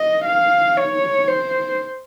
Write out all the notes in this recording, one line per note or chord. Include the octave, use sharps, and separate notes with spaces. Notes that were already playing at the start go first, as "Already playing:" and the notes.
Already playing: D#5
F5
C#5
C5